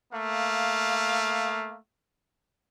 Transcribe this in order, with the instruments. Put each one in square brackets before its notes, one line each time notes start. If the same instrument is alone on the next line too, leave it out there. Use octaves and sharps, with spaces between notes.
[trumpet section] A3 A#3 F5